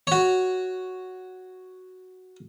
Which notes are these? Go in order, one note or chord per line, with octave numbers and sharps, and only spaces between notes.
F#4 C#5